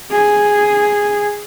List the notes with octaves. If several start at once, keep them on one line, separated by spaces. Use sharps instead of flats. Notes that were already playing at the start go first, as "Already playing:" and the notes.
G#4